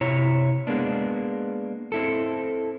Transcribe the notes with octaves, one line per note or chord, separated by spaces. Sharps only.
C3 E4 C#5 A#5
G#3 A#3 B3 D4
C4 E4 A4